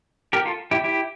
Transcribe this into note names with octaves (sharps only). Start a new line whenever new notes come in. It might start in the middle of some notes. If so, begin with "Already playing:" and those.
G4 A#4
F4 A4
E4 G4
E4 G4